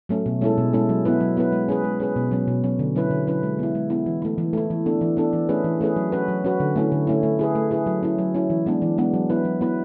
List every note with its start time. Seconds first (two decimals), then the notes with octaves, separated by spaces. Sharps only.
0.09 F#3 A3 C#4
0.26 B2
0.41 G#3 C#4 E4 A4
0.58 B2
0.73 G#3 C#4 E4 A4
0.89 F#3
1.05 B3 E4 B4
1.20 F#3
1.37 B3 E4 B4
1.52 G#3
1.69 C#4 G#4 B4
1.84 G#3
2.00 C#4 G#4 B4
2.16 B2
2.31 F#3 C#4
2.48 B2
2.64 F#3 C#4
2.79 D3
2.95 F#3 C#4 E4 B4
3.11 D3
3.27 F#3 C#4 E4 B4
3.43 G#3
3.59 B3 E4
3.75 G#3
3.90 B3 E4
4.06 E3
4.22 A3 E4
4.38 E3
4.53 A3 E4
4.70 E3
4.86 B3 D4 A4
5.01 E3
5.17 B3 D4 A4
5.33 E3
5.49 A3 C#4 G#4 B4
5.64 E3
5.81 A3 C#4 G#4 B4
5.96 F#3
6.12 C#4 F#4 B4
6.28 F#3
6.44 C#4 F#4 B4
6.60 D3
6.76 A3 C#4 E4
6.92 D3
7.07 A3 C#4 E4
7.23 A3
7.39 E4 G#4 B4
7.55 A3
7.71 E4 G#4 B4
7.87 F#3
8.03 C#4 E4
8.18 F#3
8.34 C#4 E4
8.50 E3
8.66 G#3 B3 D4
8.82 E3
8.98 G#3 B3 D4
9.14 F#3
9.30 B3 E4 B4
9.45 F#3
9.61 B3 E4 B4